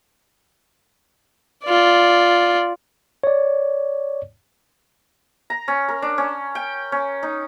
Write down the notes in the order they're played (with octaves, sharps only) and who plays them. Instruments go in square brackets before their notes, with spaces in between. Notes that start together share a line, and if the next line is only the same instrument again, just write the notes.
[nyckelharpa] F4 D5
[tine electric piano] C#5 D5
[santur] A#5
C#4
A#4
D4
C#4
G5
C#4
D#4